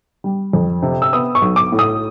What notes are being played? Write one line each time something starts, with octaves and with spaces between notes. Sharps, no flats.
G3
F2
C3
E6
B3 D#6
C#6
B1
D6
A2
D#6